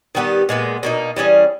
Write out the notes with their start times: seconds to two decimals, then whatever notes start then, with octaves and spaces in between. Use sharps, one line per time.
0.15 D#3 G3 B3 G4
0.49 A#2 G#3 B3
0.83 B2 A#3 D#4
1.16 E3 G3 C#4 G#4